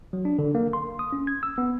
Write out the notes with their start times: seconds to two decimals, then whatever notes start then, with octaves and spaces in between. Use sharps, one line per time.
0.13 F#3
0.25 D4
0.39 D3
0.55 A#3
0.73 C6
0.99 D#6
1.13 C#4
1.27 G#6
1.43 E6
1.58 B3